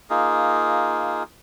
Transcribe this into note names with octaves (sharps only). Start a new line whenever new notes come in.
A#3 D#4 F4 G#4